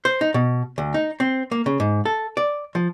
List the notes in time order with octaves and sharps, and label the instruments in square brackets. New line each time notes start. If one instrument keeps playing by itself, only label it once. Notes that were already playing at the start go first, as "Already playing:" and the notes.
[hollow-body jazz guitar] C5
D#4
B2
D2
D#4
C4
A#3
C#3
G#2
A4
D5
F3